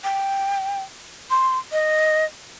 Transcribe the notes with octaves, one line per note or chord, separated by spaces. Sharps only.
G5
C6
D#5